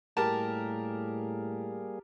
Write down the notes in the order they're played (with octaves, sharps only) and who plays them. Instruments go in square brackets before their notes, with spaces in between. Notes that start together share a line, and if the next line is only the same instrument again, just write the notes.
[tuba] A2 [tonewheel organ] G3 A#3 G#4 [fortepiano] G4 A#4 A5